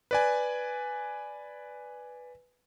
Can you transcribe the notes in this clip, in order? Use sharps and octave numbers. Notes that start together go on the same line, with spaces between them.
B4 D5 G#5